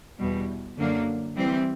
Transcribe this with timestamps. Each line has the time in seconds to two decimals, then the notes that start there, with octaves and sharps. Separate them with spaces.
0.17 E2 B2 G3
0.77 F#2 D3 F#3 A#3 D4
1.36 E3 G3 C4